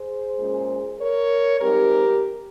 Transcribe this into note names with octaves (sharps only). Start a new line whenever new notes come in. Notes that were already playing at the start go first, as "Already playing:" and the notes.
Already playing: G#4 C5
A#2 G#3 C#4
A#4 C#5
G#2 G3 C4 G4 A#4